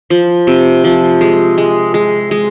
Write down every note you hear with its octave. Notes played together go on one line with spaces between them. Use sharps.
F3
C3
F3
G#3
G#3
G#3
G#3